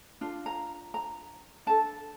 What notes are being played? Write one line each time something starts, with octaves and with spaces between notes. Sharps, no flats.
D4 F4
A#5
A#5
D4 A4 A5